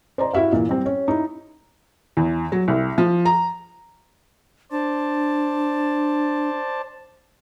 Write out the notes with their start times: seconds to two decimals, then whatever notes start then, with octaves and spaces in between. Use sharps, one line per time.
0.18 C5 D5 D#5 A#5 C6
0.34 E4 F#4 E5 F5
0.53 A#2 E3
0.69 G3 C4
0.86 C#4
1.08 D#4 E4
2.17 E2
2.52 F#3
2.68 C2
2.98 F3
3.25 A#5
4.71 D4 C5 D5 A5